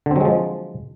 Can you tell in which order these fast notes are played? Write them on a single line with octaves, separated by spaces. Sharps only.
D3 C4 F#3 G#3 F3